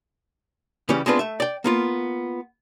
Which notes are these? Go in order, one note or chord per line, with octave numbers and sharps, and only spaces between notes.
C#3 E3 G3 C#4 G4
G#3 B3 C4 D4 F4 B4
A3 E5
D5 G5
A#3 B3 F4